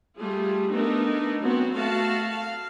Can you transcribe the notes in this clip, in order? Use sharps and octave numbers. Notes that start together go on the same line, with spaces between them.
G3 A3 F4 G#4
A3 B3 D4 D#4 A#4
F#3 B3 C4 F#4
A3 F#4 F5 A5
F5